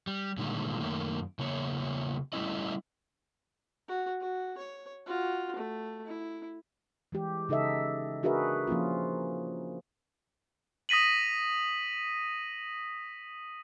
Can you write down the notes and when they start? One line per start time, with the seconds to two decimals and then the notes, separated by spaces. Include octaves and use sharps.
0.07 G3
0.38 A#2 D3 D#3 G3 G#3
0.80 F#2 D#3 A3 A#3
1.39 E2 C#3 A#3 C#5
2.33 G3 A3 C#4 E4 D#5
3.88 F#4
4.21 F#4
4.58 C#5
5.06 F4 F#4
5.56 A3
6.06 E4
7.12 E3 G#3 G4
7.49 C#3 D#4 A4 D#5 E5
8.23 D4 F#4 G#4 A#4 B4 E5
8.67 F3 A#3 C#4 F4
10.89 D#6 A#6 B6 D#7 F#7